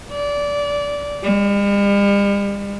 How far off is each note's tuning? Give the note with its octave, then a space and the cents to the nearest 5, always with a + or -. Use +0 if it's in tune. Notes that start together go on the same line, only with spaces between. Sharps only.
D5 -20
G3 +45